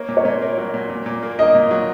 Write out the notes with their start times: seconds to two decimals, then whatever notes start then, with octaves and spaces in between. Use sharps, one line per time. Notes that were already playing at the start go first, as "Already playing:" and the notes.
Already playing: A#3 C#5
0.09 A#2
0.17 C#5
0.25 A#2
0.42 A#3
0.58 F#3
0.74 A#2
0.90 A#2
1.06 A#2
1.23 A#3
1.39 A#3 D#5
1.55 A#2
1.71 F#3